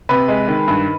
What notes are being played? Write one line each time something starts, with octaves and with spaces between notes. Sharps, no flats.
C3 B4
G#3
D#3
G2